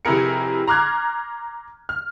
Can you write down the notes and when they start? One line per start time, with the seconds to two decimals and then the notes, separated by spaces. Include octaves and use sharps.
0.05 F1 C3 E4 G#4 A#4 C#7
0.68 A#5 C6 D6 F6 F#6 G#6
1.89 F6